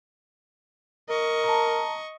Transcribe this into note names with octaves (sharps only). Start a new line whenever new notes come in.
A#4 D#5 C#6
A5 A#5